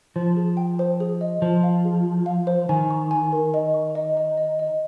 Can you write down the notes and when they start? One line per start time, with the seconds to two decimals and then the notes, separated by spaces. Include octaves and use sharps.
0.16 F3 C5
0.37 G#4
0.57 G5
0.79 C5
1.00 G#4
1.21 D#5
1.42 F3 C5
1.63 F5
1.85 G#4
2.06 G#4
2.26 F5
2.47 C5
2.69 D#3 G#5
2.90 C#6
3.11 G#5
3.32 A#4
3.54 D#5
3.74 C#6
3.95 D#5
4.17 D#5
4.37 D#5
4.59 D#5